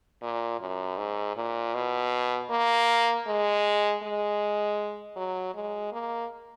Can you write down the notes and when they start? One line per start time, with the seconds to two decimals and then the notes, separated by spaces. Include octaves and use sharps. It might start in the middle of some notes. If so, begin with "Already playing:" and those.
0.22 A#2
0.60 F#2
0.98 G#2
1.37 A#2
1.74 B2
2.50 A#3
3.27 G#3
4.03 G#3
5.17 F#3
5.55 G#3
5.92 A#3